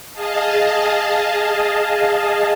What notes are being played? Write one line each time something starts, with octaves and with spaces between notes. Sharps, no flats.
G#4 D#5 F5 A5